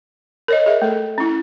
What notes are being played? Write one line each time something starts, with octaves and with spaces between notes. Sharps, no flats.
A#4 C#5 D#5
G#4 E5
A3 A4
C#4 E4